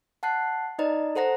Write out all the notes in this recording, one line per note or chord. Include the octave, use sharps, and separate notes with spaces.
F#5 A5 F#6 C7
D#4 B4 D5 D#5 A#5
A4 C5 F#5 A#5 A#6